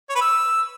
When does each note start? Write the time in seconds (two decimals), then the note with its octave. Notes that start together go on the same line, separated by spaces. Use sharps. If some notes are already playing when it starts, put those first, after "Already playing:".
0.09 C#5
0.15 B4
0.21 E6